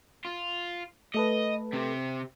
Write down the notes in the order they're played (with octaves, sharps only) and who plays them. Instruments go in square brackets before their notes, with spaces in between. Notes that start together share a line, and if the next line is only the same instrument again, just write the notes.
[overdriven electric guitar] F4
[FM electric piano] A3 A4 B4 [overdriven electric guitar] D#5
[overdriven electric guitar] C3 C4